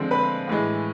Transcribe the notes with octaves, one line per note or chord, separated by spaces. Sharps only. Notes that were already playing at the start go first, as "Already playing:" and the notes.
Already playing: D3 F3 G#3 C4
B4 B5
A2 E3 G#3